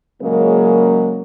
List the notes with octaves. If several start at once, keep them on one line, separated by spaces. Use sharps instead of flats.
A#2 C#3 F#3 G#3 A#3